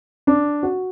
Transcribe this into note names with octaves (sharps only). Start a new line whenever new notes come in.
D4
F#4